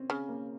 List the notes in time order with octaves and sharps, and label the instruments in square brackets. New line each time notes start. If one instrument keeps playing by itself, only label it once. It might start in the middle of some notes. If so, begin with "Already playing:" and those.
Already playing: [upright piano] C4 C#4
[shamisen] C#3
[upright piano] A#3